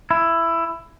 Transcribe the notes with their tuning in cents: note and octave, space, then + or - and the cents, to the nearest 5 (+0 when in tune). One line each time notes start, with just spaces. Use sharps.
E4 +15